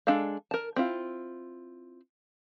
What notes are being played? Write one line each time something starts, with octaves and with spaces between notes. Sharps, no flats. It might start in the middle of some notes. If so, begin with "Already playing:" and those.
G#3 D4 A4 D#5 F5
A#4 A5
C4 E4 F4